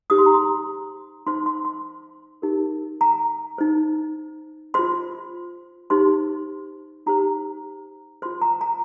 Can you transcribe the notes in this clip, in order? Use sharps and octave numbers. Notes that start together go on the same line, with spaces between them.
D#4 G4 C5 D#6
C6
A#5
C6
D#4 C5 C6
C6
C6
D#4 G4 A#4
A#5
D#4 C5
F4 C5 C6
D#4 G4 C5 C6
D#4 G4 C5 A#5
F4 C5 C6
A#5
A#5